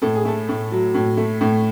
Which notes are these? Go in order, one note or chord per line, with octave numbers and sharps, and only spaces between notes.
A2 A4
G#4
A3 A4
A2
F#3
A2
A3
A2